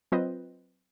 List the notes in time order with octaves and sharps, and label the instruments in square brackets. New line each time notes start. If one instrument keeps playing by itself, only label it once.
[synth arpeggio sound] F#3 C4 F4 B4 C5 D#5